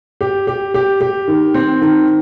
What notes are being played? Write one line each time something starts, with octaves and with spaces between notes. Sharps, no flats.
G4
G4
G4
G4
D#3
C4
D#3